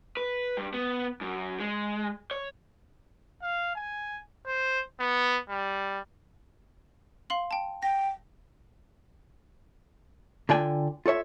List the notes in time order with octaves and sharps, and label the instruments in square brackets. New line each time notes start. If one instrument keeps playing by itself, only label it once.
[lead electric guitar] B4
G2
B3
F#2
G#3
C#5
[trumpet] F5
G#5
C5
B3
G3
[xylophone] F5 C6 F#7
G5 A5
[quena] G5 [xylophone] A#6
[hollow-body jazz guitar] D3 D4 F4 D5 G5 G#5
F4 A4 C#5 E5